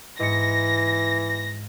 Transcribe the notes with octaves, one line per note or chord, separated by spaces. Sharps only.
G#2 E3 A#6 C#7